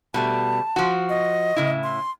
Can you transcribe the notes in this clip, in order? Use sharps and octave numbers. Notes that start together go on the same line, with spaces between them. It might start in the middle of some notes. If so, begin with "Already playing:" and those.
B2 G3 A3 A5
F3 F#4
D#5
A2 C#3 E4
C6